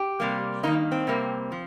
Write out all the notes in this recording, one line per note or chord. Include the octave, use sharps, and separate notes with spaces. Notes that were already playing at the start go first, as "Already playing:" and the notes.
Already playing: G4
C3 G3 A#3
G2 D#3 A#3 D#4
C4
C3 G3 A#3
F3